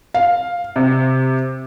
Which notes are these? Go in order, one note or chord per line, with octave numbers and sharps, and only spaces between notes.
F5
C3